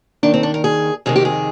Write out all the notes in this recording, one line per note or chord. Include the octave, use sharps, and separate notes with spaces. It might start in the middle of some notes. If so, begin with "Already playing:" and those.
D#2 D#3 D4
C4
D4
A#4
G#4
F2 C3 D#3 G#4
G4
G#4